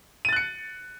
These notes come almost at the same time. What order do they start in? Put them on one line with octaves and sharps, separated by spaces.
D#7 A6 F#6 C#7